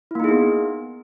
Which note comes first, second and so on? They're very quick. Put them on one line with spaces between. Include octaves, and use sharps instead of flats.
E4 A#3 D#4 G#4 B3